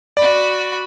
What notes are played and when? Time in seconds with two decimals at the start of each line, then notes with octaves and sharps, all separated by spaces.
0.17 F#4 D5 B5